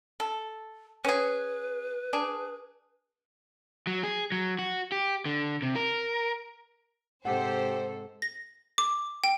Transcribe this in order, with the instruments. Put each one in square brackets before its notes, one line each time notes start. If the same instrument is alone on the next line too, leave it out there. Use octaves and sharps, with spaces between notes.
[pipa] A4
[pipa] C#4 G#4 [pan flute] B4
[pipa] D4 G#4
[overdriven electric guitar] F#3
G#4
F#3
F#4
G4
D3
C3
A#4
[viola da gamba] G#2 C3 A4 [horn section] G4 [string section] C5 [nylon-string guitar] F#5
[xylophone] A#6
D6
G5